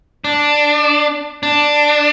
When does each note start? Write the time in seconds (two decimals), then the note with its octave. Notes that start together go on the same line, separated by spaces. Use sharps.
0.24 D4
1.43 D4